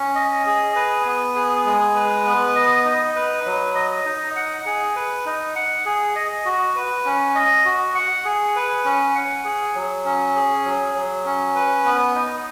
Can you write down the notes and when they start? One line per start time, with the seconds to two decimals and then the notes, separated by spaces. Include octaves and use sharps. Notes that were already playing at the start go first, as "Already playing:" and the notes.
Already playing: C#4
0.15 D#5
0.46 G#4
0.76 B4
1.06 B3
1.36 G#4
1.65 G#3
1.96 B4
2.25 B3
2.56 D#5
2.85 D#4
3.16 B4
3.46 F#3
3.75 D#5
4.06 D#4
4.36 F#5
4.66 G#4
4.96 B4
5.26 D#4
5.56 F#5
5.86 G#4
6.16 D#5
6.45 F#4
6.76 B4
7.05 C#4
7.35 D#5
7.65 F#4
7.95 F#5
8.25 G#4
8.56 B4
8.85 C#4
9.15 F#5
9.45 G#4
9.75 F#3
10.05 C#4
10.36 G#4
10.65 F#3
10.95 F#3
11.26 C#4
11.56 B4
11.85 B3
12.15 D#4